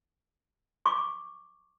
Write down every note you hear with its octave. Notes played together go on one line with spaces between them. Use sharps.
C#6 D6